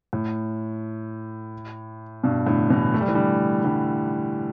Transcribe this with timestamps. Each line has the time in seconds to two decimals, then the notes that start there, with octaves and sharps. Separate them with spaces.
0.13 A2
2.24 G2 B2
2.46 A2 D3
2.70 B2 E3
2.94 A3
3.01 G3
3.08 E3
3.15 D3 G3
3.64 D3 G3